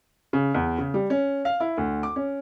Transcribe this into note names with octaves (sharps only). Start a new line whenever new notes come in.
C#3
E2
C#3
G3
C#4
F5
E4
D2
D6
C#4